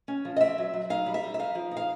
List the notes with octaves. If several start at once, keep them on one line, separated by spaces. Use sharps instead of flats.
C#4
F3
D#5
C4 E5
F#3
F#3
D#4 F5
G3
E5
D#4
E5
D#4 F5
F3
D#4
F5